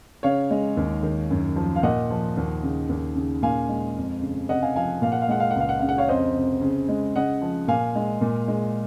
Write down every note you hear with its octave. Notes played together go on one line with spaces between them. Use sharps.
C#3 C#5 F5
G#3
D#2
D#3
F#2
F3
F5
A#2 D#5 F#5
F3
D#2
C#3
D#2
C#3
A#2 F5 G#5
G#3
F2
C#3
C3 D#5 F#5
F5 G#5
F3 F5 G#5
A#2 F5
F#5
F5
G#3 F#5
F5
F#5
C#2
F5
F#5
C#3 F5
F#5
C#5 F5
F2 C5 D#5
C3
C#3
G#3
C#3 D#5 F#5
F3
A#2 F5 G#5
G#3
A#2
G#3